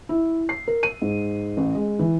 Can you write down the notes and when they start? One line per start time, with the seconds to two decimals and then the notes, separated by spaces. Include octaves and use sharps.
0.09 E4
0.49 C7
0.68 A#4
0.83 D#7
1.02 G#2
1.57 A1
1.75 G#3
1.99 E3